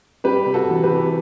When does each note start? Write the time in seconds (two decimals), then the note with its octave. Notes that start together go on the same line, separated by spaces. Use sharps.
0.24 G3 G4 B4
0.46 C3
0.54 F#4 A4
0.70 E3
0.84 G4 B4
0.91 C3